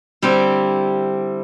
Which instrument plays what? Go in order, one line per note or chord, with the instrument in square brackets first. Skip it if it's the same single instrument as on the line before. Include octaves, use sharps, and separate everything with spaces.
[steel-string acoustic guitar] D3 G3 C4 E4 G4